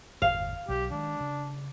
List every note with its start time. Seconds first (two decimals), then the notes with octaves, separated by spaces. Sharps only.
0.22 G1 E2 A2 F5
0.69 B1 F#3 G4
0.91 D#3 G#3 D4
1.21 C#3